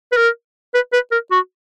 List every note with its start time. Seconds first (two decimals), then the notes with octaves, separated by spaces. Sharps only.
0.12 B4
0.17 A#4
0.74 B4
0.93 B4
1.12 A#4
1.31 F#4